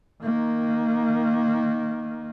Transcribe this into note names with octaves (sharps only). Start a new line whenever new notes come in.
D#3 A#3